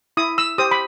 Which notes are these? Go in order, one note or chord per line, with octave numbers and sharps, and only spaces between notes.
E4 D#6
E6
G4 C5 D#6
B5